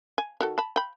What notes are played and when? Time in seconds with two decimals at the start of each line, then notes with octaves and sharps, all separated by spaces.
0.18 G#5
0.41 D#3 F#4 A4
0.58 A5 B5
0.76 G5 B5